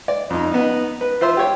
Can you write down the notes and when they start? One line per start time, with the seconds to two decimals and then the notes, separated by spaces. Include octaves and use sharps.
0.08 D5
0.30 F2 D#4
0.51 B3 D#4
1.01 B4
1.21 F4 C5 E5 C6
1.37 G4 C#5